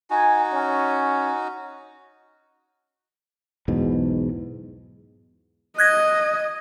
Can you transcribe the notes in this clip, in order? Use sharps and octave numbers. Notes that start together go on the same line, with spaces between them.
D#4 F#4 G#5
C#4
B1 E2 G#2 B2
D#5 F#6 G#6 A#6